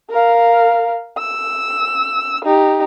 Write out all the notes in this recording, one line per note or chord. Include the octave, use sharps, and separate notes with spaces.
A#4 F5
E6
D#4 G4